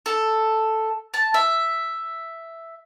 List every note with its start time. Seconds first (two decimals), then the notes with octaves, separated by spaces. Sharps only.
0.06 A4
1.14 A5
1.34 E5